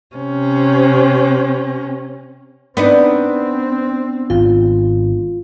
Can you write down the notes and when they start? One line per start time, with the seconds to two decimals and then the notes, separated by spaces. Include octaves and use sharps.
0.16 C3 C#4
2.77 B3 C4 D4 D#4
4.30 G#1 F4